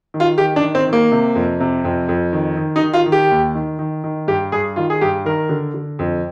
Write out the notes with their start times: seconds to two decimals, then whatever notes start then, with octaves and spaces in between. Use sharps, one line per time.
0.14 D#3
0.20 F4
0.38 D#3 G4
0.56 D4
0.62 D#3
0.75 C4
0.87 D#3
0.93 A#3
1.12 C3
1.35 F2
1.60 C3
1.85 F2
2.09 F2
2.33 D#3
2.57 D#3
2.76 D#4
2.82 D#3
2.93 F4
3.06 D#3
3.12 G4
3.31 D#2
3.55 D#3
3.79 D#3
4.04 D#3
4.28 G2 G4
4.52 G2 G#4
4.76 D#3 F4
4.90 G#4
5.01 G2 G4
5.25 D#3 A#4
5.49 D3
5.74 D3
5.99 F2